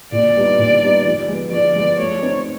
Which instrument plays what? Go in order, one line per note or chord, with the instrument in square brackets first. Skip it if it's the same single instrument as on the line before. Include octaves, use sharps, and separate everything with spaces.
[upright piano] A#2 [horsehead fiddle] D5
[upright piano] G3 B3 D#4
A#2
G3 B3 D#4
F3
G#3 B3
[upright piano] F3 [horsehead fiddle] D5
[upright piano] G#3 B3
[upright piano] A3 [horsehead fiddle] C#5
[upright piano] C4 D#4